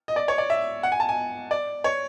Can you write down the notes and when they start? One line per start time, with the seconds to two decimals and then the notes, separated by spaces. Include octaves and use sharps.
0.08 D#5
0.16 D5
0.28 C#5
0.38 D5
0.50 E5
0.83 F#5
0.92 G#5
1.00 A5
1.09 G#5
1.51 D5
1.84 C#5